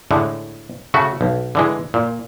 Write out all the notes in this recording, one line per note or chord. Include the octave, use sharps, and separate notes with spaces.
A2 D3 G#3 A3
C#3 A3 F#4
B1
D3 E3 G#3
A#2